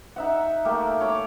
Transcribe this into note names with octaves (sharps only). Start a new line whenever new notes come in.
D#4 E5 F#5
A3 A#3 G4
C#5 D6